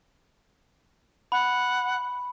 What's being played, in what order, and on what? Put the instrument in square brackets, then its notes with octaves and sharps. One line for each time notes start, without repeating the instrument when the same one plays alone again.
[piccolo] F#5 [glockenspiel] B5